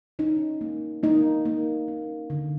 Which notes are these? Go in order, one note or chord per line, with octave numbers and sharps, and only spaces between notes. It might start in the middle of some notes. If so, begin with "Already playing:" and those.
C#4 D#4
A#3
A#3 D#4
A#3
C#4
D3